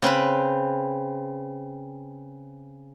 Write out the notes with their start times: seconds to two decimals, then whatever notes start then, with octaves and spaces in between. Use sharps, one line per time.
0.02 C#3 C4 B4 B5